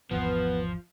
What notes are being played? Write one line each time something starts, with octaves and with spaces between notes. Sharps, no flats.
G#1 E2 F3 B3 B4